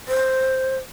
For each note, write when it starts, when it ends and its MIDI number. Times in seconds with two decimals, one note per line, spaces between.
0.08 0.76 72